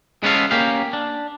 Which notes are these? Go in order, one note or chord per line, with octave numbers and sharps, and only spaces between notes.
G#3 B3 C#4 A4 F5
A#3 C#4 G4 F5
D4